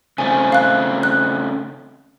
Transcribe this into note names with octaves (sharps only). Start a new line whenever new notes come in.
C#3 A3 C4 G#5
F5 F#6
F#6